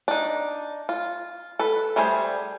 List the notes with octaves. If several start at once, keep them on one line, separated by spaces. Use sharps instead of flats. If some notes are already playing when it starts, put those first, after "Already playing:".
D4 D#4
F4
A4 B4
G3 A3 G#4 A#4 C5